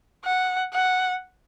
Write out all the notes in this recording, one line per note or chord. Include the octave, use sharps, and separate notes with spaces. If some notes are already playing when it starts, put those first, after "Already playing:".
F#5
F#5